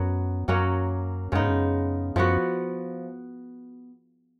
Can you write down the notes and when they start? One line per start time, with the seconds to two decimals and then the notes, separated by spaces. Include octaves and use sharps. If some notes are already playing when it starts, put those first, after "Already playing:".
Already playing: F#2 F#3 B3 F#4
0.48 F#2 F#3 A#3 C#4 F#4
1.32 F#2 C#3 G#3 B3 D#4
1.41 G#2
1.49 F#2
2.16 F#2 F3 B3 F#4